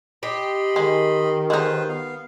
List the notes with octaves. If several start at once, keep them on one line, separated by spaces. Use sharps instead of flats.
G4 D#5 B5 C6
D#3 G#3
G#3 D#4 F4 B4 C5
B3 F5